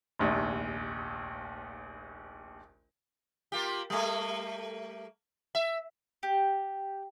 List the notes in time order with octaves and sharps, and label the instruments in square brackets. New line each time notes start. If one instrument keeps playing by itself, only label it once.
[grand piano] F1 A#1 D#2
[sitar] A#3 F4 G4
G3 A3 A#3
E5
[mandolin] G4